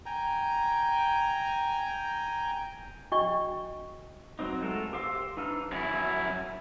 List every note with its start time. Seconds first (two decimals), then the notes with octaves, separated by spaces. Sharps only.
0.06 G5 G#5 A#5
3.12 D4 F#4 D#5 G5 C#6
4.39 F#3 C4 D#4
4.61 G#3 A3 F4 A4 A#4
4.93 G4 C5 F5 C6 E6
5.37 E3 D4 D#4 E6 F6
5.72 F#2 E4